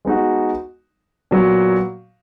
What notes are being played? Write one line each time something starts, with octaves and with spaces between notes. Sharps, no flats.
G#3 B3 D#4 F#4
A#2 F#3 B3